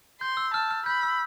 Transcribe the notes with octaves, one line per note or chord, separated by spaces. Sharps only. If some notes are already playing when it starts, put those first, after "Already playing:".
C6 G6
E6
A5 F6
F6
B5 G6
E6